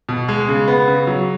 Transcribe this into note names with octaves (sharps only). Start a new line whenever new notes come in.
B2
G#3
C#3
B3
C#3
F#3